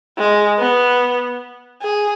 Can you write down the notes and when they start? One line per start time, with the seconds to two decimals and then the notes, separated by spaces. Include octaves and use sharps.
0.18 G#3
0.60 B3
1.82 G#4